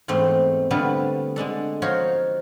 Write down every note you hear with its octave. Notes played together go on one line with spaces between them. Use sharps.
E2 G#2 A3 C4
D3 G3 A3 B3 C4 F4
D3 G#3 D4 A4
F3 D#4 F4 F#4 C#5